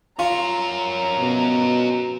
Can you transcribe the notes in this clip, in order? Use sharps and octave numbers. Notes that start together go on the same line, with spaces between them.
C#4 F4 A#4 A#5
B2